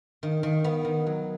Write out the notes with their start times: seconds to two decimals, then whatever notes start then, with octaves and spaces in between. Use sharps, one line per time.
0.23 D#3
0.43 D#3
0.64 B3
0.85 D#3
1.06 F#3